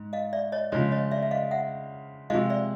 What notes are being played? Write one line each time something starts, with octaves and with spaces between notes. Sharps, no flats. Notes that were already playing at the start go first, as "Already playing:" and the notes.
Already playing: G#2
D#5 F5
D5 E5
C#5 D#5
C#3 F3 G#3 C#5 D#5
C#5 D#5
D5 E5
E5
D#5 F5
E5 F#5
C3 F3 G#3 D#5 F5
D5 E5